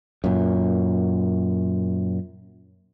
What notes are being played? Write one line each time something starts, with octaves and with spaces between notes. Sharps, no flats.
F#2 A#2